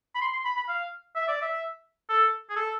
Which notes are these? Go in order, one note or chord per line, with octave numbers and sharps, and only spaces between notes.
B5
C6
C6
B5
B5
F5
E5
D5
E5
A4
G#4
A4